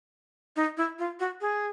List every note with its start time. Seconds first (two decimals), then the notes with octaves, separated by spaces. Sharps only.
0.56 D#4
0.77 E4
0.99 F4
1.20 F#4
1.41 G#4